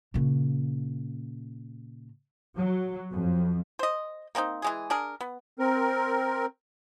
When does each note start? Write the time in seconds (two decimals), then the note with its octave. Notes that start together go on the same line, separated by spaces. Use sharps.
0.14 A#2 C#3
2.57 F#3
3.12 F2
3.79 C5 D#5
4.35 A#3 C4 D4 D#4
4.62 E3 G#3 G#4
4.90 D4 G#4 A#4
5.21 B3
5.59 C4 A#4